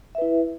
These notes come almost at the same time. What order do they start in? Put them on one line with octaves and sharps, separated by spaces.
E5 B4 E4